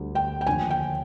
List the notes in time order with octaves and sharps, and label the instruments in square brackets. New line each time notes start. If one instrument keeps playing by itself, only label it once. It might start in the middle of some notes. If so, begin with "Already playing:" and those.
Already playing: [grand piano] D2 D3 G3
[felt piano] G5
G5
[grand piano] D#2 D3 F3 [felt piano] G#5
[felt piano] G5